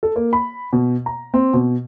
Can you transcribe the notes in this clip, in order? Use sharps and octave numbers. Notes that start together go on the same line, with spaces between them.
A4
A#3
B5
B2
A#5
C4
B2